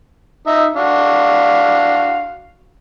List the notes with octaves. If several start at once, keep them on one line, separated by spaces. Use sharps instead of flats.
D#4 E5
D4 F#4 F5